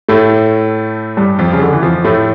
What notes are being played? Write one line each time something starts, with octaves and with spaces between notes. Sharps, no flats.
A2 A3
G2 G3
F2 F3
C#3
D3
E3
F2 F3
A2 A3